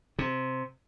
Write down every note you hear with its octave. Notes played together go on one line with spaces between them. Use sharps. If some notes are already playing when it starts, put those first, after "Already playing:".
C3